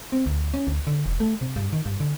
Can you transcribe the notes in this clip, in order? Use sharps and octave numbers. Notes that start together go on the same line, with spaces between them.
C4
D2
C#4
D2
D3
E1
A3
C3
G2
D#3
G2
D3